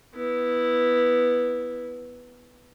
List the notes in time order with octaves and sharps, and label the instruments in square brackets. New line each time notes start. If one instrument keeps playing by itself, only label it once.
[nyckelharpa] B3 E4